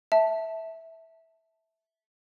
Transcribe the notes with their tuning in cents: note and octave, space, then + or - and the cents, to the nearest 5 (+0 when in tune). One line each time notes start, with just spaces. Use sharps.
E5 -10 A5 +0